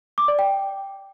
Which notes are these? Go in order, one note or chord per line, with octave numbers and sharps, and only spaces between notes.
D6
D5
G5